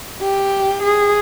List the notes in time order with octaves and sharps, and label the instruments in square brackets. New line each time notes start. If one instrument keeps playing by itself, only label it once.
[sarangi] G4
G#4